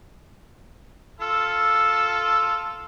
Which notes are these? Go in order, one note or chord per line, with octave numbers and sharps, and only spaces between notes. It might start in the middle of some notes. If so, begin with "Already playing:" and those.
F4 A4 E6